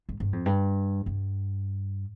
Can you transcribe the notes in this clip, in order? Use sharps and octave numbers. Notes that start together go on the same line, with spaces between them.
G2
G2
F2
G2
G2